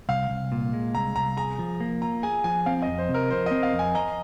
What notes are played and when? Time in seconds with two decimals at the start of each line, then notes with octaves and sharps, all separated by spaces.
0.09 C2 F5
0.30 C2
0.52 A#2
0.73 G#3
0.95 C2 A#5
1.16 C2 A#5
1.37 G#4 A#5
1.59 F3
1.80 A#3
2.02 F4 A#5
2.23 G#4 G#5
2.44 F3 G#5
2.66 C4 F5
2.82 D#5
2.88 F2
2.98 C5
3.09 C3
3.14 A#4
3.30 F3 C5
3.46 D#5
3.51 C4
3.63 F5
3.73 F2
3.79 G#5
3.95 D#5 A#5